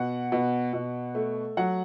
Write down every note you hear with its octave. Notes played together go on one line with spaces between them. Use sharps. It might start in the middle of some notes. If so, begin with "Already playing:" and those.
Already playing: B2 F#5
B2
B2
A3
F#3 F#5